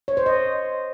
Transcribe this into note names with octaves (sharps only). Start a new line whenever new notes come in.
C#5
C5
D#5